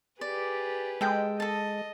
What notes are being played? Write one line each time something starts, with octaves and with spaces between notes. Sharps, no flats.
G4 G#4 B4 D5
G#3 A4 G5
A4 D#5 A5